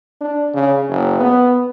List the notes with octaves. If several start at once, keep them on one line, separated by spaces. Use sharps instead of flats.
D4
C#3
F#1
B3